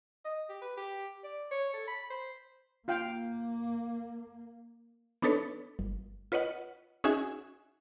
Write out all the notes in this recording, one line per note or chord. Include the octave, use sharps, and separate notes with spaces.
D#5
G4
B4
G4
D5
C#5
A4
B5
C5
A#3 F4 F5 G5
B3 D4 D#4 A4 B4 C#5
G1
F4 B4 C#5 D#5 F#5
C#4 D#4 F#4 G#4 E5 G#5